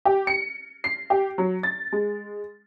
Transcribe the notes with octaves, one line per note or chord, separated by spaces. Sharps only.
G4
C#7
C7
G4
F#3
A6
G#3